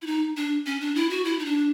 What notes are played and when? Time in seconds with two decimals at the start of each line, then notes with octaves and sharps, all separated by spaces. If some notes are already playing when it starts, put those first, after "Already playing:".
0.02 E4
0.07 D#4
0.37 D4
0.66 C#4
0.81 D4
0.95 E4
1.10 F#4
1.25 E4
1.39 D#4
1.45 D4